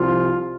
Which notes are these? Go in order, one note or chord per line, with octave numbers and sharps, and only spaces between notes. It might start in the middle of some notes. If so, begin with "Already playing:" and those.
Already playing: C2 C3 F3 F4